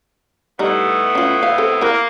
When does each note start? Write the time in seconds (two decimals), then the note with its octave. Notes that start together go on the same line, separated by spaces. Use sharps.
0.59 A2 G3 B3 D#4
1.15 C#4 F4
1.43 F5
1.58 C4 A4
1.81 A#3 E4 A#4